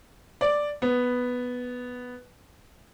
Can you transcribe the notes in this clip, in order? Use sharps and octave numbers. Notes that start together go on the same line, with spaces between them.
D5
B3